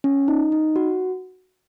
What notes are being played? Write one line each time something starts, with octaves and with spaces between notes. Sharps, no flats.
C#4
D#4
D#4
F#4